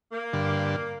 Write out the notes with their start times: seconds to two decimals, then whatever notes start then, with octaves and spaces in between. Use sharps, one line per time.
0.12 A#3
0.33 G2 D3